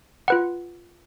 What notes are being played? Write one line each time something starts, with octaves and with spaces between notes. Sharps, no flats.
F4 B4 F#5